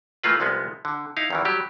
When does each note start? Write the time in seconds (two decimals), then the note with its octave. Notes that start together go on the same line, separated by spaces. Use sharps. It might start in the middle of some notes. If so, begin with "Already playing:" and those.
0.24 E3 A3 A#3 F4 B4
0.40 C2 F3 G#3 B3
0.85 D3
1.17 D#4 E4 F5
1.30 E2 D#3 E3
1.45 F#3 G3 G4